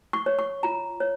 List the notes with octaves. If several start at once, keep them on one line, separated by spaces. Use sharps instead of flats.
C#6
C#5
C#6
F4 A#5
C#5